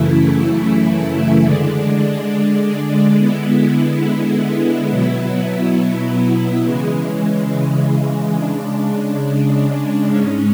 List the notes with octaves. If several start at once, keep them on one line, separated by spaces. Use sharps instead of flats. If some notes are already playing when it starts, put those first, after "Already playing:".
Already playing: F#2 C#3 E3 A3 E4
D3 G#3 D4
D3 G#3 B3 E4
B2 F#3 B3 E4
C#3 E3 G#3
C#3 G#3 D4
G#2 G#3 C#4